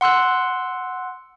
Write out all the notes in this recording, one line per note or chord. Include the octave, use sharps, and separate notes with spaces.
F#5 C6 E6 F#6